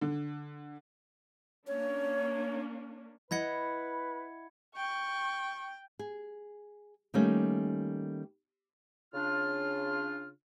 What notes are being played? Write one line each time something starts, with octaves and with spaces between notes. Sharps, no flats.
D3
A#3 C#4 D4 C#5
E4 B4 D#5 F#5 B5 G#6 C#7
G5 C#6
G#4
D#3 G3 A3 A#3 C#4
C#3 D4 F4 F6